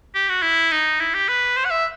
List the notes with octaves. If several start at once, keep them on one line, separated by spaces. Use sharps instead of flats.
G4
F#4
E4
D#4
E4
G4
B4
C5
F#5
E5